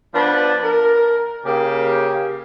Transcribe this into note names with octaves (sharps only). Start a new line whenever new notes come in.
F3 B3 D4 B4 D5 A5
A#4
C#3 A#3 G4